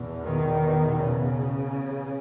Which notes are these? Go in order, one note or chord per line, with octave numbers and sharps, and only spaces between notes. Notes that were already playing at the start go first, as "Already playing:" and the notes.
Already playing: E2 B2
D#3
C#3